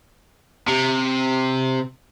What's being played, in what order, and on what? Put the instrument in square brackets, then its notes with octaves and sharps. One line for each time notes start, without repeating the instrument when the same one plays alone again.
[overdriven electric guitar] C3